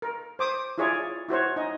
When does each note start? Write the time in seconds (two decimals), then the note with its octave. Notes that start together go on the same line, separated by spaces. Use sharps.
0.02 A#4
0.39 C5 D6 D#6
0.78 E4 F4 G#4 C#5 D5
1.29 E4 F#4 C5 C#5
1.56 D#4 D#5